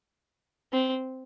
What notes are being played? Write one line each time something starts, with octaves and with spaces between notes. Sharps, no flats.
C4